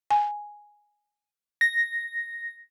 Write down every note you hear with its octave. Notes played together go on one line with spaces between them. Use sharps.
G#5
A#6